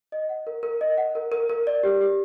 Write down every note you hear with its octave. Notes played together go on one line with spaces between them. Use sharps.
D#5
F#5
A#4
A#4
D#5
F#5
A#4
A#4
A#4
D5
G4
G4